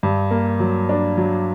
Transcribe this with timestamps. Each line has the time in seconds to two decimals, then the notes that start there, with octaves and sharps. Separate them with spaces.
0.03 G2
0.31 A#3
0.60 F#3
0.89 D4
1.17 F#3